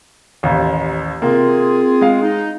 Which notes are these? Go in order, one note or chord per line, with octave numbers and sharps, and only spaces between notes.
A1 D#2
C3 A#3 C4 F4 G#4
G#3 F5
D#4